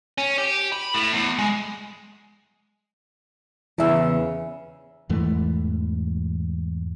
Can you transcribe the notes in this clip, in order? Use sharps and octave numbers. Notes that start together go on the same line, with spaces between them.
C#4
G4
B5
A2
E2
G#3
E2 C#3 E3 E5 E6
E2 G#2 E3 A3